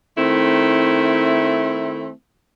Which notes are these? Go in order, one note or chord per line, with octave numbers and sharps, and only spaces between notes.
D#3 A3 C4 E4